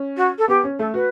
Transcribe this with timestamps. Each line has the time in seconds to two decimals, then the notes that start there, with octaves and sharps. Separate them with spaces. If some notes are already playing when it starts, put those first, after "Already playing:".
Already playing: C#4
0.17 F#4
0.38 A4
0.48 B3 G4
0.64 C#4
0.79 A3 A4
0.94 F#4 B4